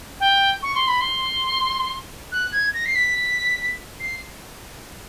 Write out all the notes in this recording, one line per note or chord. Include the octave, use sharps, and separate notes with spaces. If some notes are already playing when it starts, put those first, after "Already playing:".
G5
C#6
C6
B5
C6
F#6
G#6
A#6
C7
B6
C7